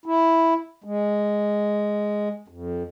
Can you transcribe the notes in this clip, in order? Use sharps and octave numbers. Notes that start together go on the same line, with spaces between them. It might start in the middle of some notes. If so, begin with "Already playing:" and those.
E4
G#3
F2